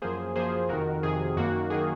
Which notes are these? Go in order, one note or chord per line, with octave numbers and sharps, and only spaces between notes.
F#2 F3 A#3 G#4 C5
F#2 F3 A#3 G#4 C5
F2 C3 D#3 F#4 A#4
F2 C3 D#3 G#4
F#2 D#3 A#3 F#4
D#3 A#3 G#4